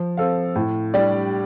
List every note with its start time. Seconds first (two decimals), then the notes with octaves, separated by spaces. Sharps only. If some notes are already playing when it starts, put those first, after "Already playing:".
Already playing: F3
0.17 C4 A4 F5
0.55 A2
0.94 G3 D4 G4 D5